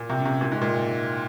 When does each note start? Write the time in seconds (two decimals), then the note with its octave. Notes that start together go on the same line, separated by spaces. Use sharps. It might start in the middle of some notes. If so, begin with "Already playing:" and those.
Already playing: A#2
0.10 C3
0.20 C#3
0.25 C3
0.41 A#2
0.52 G#2
0.62 A#2